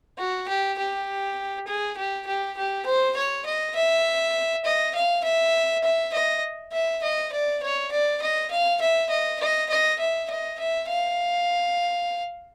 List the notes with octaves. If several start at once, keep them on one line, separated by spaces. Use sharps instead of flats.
F#4
G4
G4
G#4
G4
G4
G4
C5
C#5
D#5
E5
D#5
F5
E5
E5
D#5
E5
D#5
D5
C#5
D5
D#5
F5
E5
D#5
D#5
D#5
E5
D#5
E5
F5